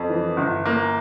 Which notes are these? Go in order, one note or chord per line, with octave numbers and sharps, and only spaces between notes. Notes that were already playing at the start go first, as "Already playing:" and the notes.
Already playing: F2
E3
G1
A#3